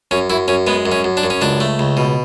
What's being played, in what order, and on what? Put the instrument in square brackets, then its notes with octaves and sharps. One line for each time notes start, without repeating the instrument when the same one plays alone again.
[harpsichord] F#2 C#4
F#2 E4
F#2 C#4
G#3 B3
F#2
C#4
F#2
D4
F#2
C#4
C#2 D4
A3
C#2
B2